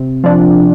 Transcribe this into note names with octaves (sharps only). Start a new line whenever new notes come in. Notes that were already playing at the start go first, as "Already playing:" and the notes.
Already playing: C3
F3 D4